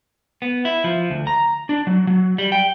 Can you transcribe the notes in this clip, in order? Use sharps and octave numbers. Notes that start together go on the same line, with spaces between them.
B3
E4
F3
D2
A#5
D4
F#3
F#3
G3
G5